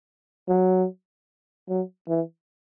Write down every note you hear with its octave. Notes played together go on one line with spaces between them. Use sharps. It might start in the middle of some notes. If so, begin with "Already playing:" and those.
F#3
F#3
E3